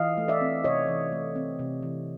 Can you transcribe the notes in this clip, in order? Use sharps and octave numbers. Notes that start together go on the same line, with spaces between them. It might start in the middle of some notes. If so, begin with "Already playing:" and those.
Already playing: E3 D#5 F5
A3
D5 E5
C4
C3 C#5 D#5
E3
A3
C4
C3
E3